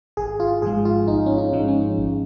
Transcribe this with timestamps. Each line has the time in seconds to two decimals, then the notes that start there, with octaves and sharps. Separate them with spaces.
0.17 G#1 G#4
0.40 F4
0.62 G#2 F3 G#3 G#4
0.85 F4
1.08 G#1 D#4
1.26 C#4
1.38 D#4
1.53 G#2 F3 G#3
1.68 C#4
1.98 G#1